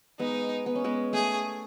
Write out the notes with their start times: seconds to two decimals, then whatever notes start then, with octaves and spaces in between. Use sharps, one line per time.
0.19 G#3 B3 D#4
0.66 B3
0.75 C#4
0.84 G#3 B3
1.13 A3 G#4